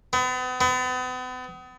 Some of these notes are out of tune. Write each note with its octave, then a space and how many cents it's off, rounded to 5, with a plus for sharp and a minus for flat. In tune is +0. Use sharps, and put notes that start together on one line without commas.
B3 +40
B3 +40